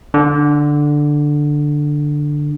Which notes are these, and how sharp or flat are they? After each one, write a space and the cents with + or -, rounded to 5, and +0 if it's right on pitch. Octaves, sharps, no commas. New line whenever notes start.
D3 +5